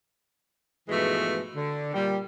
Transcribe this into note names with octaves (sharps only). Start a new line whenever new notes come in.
G#2 B2 E3 F3 G#3 A3
D3
A#2 G3